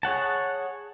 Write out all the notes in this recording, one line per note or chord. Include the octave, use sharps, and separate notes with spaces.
G#4 C#5 F#5 A5